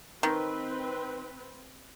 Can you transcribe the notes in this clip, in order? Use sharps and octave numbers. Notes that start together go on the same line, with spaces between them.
D#3 C4 B4